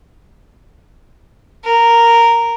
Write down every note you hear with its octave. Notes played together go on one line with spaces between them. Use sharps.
A#4